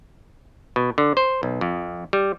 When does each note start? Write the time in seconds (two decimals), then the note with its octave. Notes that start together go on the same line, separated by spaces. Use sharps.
0.76 B2
0.98 D3
1.17 C5
1.43 B1
1.61 F2
2.13 G3